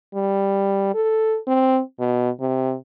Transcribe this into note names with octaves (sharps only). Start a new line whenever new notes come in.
G3
A4
C4
B2
C3